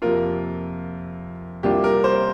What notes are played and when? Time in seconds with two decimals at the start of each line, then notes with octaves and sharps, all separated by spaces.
0.02 F2 C3 A#3 F4 A#4
1.63 C2 C3 A#3 D4 F4 G4
1.84 A#4
2.04 C5